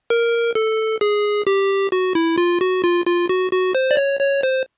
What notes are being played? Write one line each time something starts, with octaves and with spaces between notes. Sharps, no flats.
A#4
A4
G#4
G4
F#4
E4
F4
F#4
F4
F4
F#4
F#4
C5
D5
C#5
C#5
C5